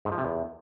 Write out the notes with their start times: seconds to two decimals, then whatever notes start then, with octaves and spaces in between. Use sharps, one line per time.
0.05 G#2
0.12 F3
0.18 C3
0.25 E2